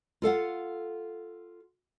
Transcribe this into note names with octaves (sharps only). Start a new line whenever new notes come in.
F4 A4 F5 F#5